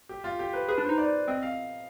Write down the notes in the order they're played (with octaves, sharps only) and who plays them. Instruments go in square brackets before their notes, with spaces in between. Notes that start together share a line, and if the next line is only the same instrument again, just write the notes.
[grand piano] G4
F4
G4
B4
[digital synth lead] G#4 [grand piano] B4
[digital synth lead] D4
[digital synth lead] D#4 [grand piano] C5
[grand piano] D5
[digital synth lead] C4 [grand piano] D#5
[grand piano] F5